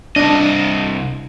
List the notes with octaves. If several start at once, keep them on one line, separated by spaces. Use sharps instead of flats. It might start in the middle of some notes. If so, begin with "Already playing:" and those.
C2 D4 D#5